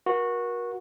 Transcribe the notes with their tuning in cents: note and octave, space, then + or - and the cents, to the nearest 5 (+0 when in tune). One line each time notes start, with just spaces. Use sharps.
F#4 -15 A#4 +35